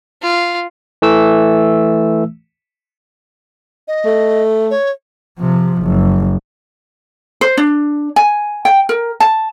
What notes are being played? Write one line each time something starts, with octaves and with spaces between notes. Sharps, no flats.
F4
E3 A3 E6
D#5
A3
C#5
C3 F3
F#1
C5
D4
G#5
G5
A#4
A5